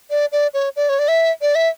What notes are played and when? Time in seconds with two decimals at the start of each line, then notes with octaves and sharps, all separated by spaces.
0.10 D5
0.32 D5
0.54 C#5
0.76 D5
0.89 C#5
0.99 D5
1.08 E5
1.41 D5
1.55 E5